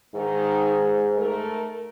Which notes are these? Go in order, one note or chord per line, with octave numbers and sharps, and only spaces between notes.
G#2 D#3 D#4
A3 A#4